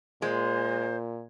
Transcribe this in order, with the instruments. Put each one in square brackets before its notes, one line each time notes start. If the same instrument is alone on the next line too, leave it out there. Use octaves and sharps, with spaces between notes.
[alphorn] A#2 [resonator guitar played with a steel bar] G#3 [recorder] C5